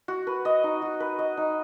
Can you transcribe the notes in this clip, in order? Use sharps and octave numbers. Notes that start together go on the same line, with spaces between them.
F#4
B4
D#5
D#4
F#4
B4
D#5
D#4